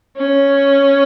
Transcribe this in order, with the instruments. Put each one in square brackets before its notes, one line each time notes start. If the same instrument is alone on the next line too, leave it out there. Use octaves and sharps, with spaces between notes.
[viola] C#4